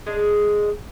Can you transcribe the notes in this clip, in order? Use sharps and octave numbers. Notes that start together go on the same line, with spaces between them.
G#3 D4 G#4